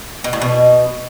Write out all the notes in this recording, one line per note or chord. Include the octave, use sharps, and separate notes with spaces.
B2
A2
B2